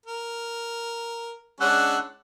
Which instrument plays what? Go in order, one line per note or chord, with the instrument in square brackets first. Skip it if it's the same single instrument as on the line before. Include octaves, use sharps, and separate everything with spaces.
[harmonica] A#4
[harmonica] G#3 C#4 D4 [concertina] F#5 E6 F#6